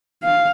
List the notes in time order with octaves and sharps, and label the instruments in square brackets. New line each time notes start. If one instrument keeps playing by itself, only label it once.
[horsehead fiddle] F5